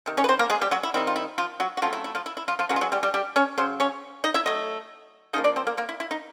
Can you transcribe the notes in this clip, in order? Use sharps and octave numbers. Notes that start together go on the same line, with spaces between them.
C3 D#3
C#4 C#5
B4
C4 C5
A#3 A#4
G#3 G#4
G3 G4
F#3 F#4
E4
D#3 G3 C4 D#4 E4
F4
E4
F3 F4
F#3 F#4
F#4
C#3 F3 F#3 A3 C4 F4
E4
E4
F3 F4
E4
E4
F3 F4
F3 F4
C#3 E3 F#3 G#3 F#4
F4
F#3 F#4
G3 G4
G3 G4
G3 G4
C#4 C#5
C#3 F#3 C5
C#4 C#5
D#4 D#5
E4 E5
F#3 A3 D#5
C#3 F3 A#3 D#4 D#5
D4 D5
C4 C5
A#3 A#4
A#3 A#4
E4
E4
D#4